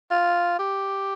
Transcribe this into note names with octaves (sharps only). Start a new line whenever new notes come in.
F4
G4